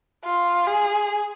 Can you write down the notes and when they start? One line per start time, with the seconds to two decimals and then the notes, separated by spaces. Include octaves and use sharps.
0.24 F4
0.67 G#4